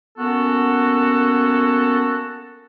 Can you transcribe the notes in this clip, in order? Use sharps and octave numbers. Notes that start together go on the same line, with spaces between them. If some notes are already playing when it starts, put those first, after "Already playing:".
A#3 B3 C#4 F#4 A4